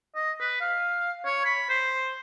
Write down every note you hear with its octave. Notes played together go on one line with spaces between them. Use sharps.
D#5
B4
F5
C#5
B5
C5